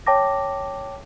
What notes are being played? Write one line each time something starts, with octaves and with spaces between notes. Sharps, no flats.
C#5 G5 A5 D6 A#6